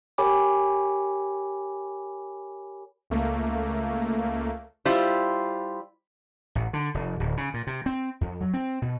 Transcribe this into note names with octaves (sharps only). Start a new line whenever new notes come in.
G4 A#4 C#5 G#5 B5 D6
C#2 A3 A#3
G3 E4 F4 C5
A1
D3
F1
D1
C#3
A#2
C3
C4
F2
F#3
C4
B2